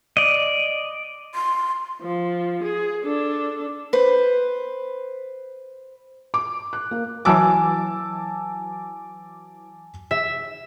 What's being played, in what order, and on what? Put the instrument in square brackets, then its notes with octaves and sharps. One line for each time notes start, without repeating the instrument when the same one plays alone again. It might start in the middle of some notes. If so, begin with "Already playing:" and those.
[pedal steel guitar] D5 D#5
[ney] C6
[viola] F3
G#4
D4 A4
[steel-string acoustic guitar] B4 C5
[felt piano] D6
F#6
A#3
[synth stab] E3 F#3 D6 [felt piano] G#5 A5 E6
[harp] E5